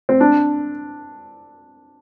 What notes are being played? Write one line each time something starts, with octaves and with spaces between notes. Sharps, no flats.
C4
D4